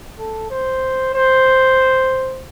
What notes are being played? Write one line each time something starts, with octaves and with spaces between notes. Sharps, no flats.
A4
C5
C5